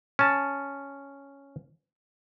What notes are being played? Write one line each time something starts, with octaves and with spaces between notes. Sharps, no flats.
C#4 A5